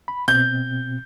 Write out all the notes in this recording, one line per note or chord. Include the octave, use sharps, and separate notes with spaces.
B5
B2 C4 G6